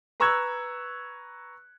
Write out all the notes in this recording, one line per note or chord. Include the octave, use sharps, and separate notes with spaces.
B4 A#5 C#6 E6 F#6 G#6